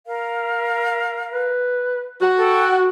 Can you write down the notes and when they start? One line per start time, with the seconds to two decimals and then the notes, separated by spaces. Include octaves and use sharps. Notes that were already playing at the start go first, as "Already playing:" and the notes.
0.07 A#4 F5
1.33 B4
2.21 F#4
2.38 A4 G5